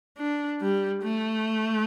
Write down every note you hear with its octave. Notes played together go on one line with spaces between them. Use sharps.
D4
G3
A3